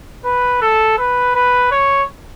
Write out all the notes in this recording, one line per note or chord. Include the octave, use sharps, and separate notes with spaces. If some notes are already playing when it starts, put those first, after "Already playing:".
B4
A4
B4
B4
C#5